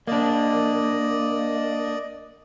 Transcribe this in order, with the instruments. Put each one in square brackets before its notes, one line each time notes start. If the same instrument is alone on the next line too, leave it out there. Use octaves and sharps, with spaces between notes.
[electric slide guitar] A#3 D4 [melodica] D5 D#5